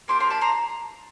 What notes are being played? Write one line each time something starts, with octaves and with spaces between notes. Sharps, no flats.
A#3 D4 G4 C6 D6
A#5 C6
A5 B5
A#5 C6